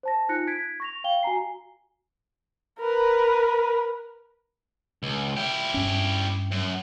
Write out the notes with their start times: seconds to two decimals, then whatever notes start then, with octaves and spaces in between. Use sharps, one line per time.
0.03 C5 A5 A#6
0.29 D#4 F4 F#6 A#6 C#7
0.47 G#6 B6 D7
0.80 C#6 A#6 F7
1.04 F5 G5 G7
1.23 F#4 G#5 A#5 C7
2.79 A#4 B4
5.03 C#2
5.37 E4 G4
5.74 G2 C#4
6.51 F#2